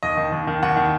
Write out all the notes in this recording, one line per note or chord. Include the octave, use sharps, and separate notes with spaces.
D#2 D#5
D#3
D#2
D#3
D#2 F#5
D#3